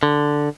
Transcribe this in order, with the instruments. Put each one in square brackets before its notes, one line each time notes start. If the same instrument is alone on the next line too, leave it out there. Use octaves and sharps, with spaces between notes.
[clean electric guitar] D3